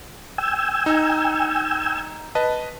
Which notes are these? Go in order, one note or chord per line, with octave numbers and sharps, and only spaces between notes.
G5 G#5 E6
D#4
B4 D#5 A5